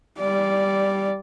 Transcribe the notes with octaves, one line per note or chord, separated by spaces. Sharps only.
G3 D5